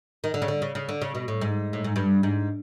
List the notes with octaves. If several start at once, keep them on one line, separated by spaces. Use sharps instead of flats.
D#3
D3
C#3
D3
C#3
C#3
D3
C#3
B2
A2
G#2
A2
G#2
G2
G#2